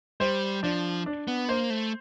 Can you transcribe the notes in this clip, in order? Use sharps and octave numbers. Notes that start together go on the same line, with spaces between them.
G3 C5
F3 D4
D4
B3
A#3 C5
A3